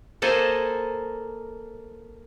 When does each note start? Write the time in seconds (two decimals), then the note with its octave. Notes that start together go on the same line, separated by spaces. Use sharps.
0.22 A#3 A4 C5 D#5 G#5